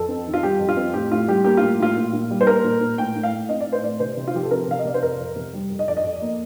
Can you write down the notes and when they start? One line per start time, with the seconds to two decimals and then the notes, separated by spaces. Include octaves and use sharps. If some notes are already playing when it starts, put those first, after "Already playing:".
Already playing: F2 A4
0.08 C4
0.27 D#3
0.34 F4
0.43 G3 G4
0.59 F2
0.69 F4
0.77 C4
0.94 A2 G4
1.12 A2 F4
1.28 G3 G4
1.44 A#3 G4
1.57 A2 F4
1.80 A2 F4
1.96 A#2
2.13 A#2
2.31 G3
2.41 C5
2.47 A#3 A#4
2.65 A#2
2.81 A#2
2.98 A2 G5
3.15 A2
3.23 F5
3.32 A3
3.49 C4 D#5
3.61 D5
3.66 A2
3.73 C5
3.83 A2 D5
4.00 C3 C5
4.17 C3
4.28 F4
4.34 F3 G4
4.43 A4
4.51 C4 A#4
4.68 C3 F5
4.79 D#5
4.85 C3 D5
4.94 C5
5.02 F2 A#4
5.19 F2
5.36 C3
5.53 G3
5.70 F2
5.79 D#5
5.88 F2 D5
5.97 D#5
6.04 F2
6.22 A#3